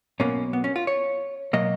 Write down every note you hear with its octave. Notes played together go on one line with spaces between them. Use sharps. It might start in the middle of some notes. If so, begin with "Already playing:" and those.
B1 B2 A#3 C#4
B3
C#4
F4
C#5
B2 F#3 A#3 D#5